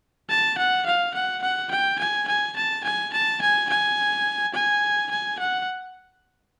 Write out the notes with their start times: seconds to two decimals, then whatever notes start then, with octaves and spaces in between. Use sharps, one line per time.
0.29 A5
0.58 F#5
0.86 F5
1.14 F#5
1.42 F#5
1.71 G5
1.99 G#5
2.28 G#5
2.56 A5
2.84 G#5
3.13 A5
3.42 G#5
3.69 G#5
4.54 G#5
5.11 G#5
5.40 F#5